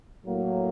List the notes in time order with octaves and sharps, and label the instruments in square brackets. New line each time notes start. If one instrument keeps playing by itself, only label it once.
[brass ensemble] A2 F#3 A#3